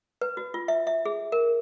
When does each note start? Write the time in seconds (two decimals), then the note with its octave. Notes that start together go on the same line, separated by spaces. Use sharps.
0.21 B4
0.37 F#4
0.54 F4
0.68 E5
0.87 E5
1.05 G#4
1.32 A#4